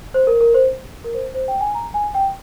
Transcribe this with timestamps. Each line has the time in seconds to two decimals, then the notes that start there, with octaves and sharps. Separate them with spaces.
0.14 C5
0.27 A#4
0.41 A#4
0.54 C5
1.04 A#4
1.14 C5
1.34 C5
1.48 G5
1.61 G#5
1.74 A#5
1.94 G#5
2.14 G5